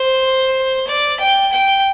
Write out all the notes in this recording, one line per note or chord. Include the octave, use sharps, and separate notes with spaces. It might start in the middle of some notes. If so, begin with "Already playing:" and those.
Already playing: C5
D5
G5
G5